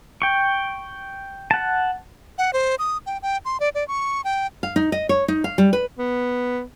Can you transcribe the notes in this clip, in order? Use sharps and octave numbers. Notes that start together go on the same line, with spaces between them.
G5 C#6
F#5 A5
F#5
C5
D#6
G5
G5
C6
D5
D5
C#6
G5
F5
D#4
D#5
C#5
D#4
F5
G3
B4
B3